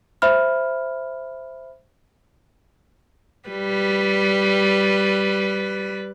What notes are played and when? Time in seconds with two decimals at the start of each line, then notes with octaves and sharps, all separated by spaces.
0.22 C5 E5 B5 F6
3.49 G3 B4